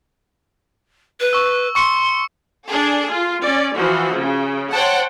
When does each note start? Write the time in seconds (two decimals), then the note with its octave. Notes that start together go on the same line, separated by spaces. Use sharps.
1.20 B4
1.33 C#6 E6
1.75 C6 C#6 C#7
2.67 D4 G#4 A4
3.11 F4
3.43 C#4 D5
3.76 E3 F3 F#4
4.15 C#3
4.71 C5 C#5 F#5 G5 A5